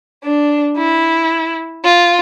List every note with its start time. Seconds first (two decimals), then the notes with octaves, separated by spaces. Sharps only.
0.24 D4
0.77 E4
1.84 F4